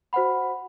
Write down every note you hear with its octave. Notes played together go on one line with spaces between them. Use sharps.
F#4 C5 F#5 B5